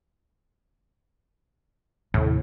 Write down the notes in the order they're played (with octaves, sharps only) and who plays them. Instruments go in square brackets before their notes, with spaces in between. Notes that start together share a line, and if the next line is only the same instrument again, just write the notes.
[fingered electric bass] D#2 C3 [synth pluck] A2